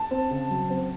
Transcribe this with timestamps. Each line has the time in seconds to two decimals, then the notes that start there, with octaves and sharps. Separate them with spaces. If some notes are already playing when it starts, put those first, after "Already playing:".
Already playing: A5
0.11 C4
0.31 C#3
0.50 F#3
0.70 C4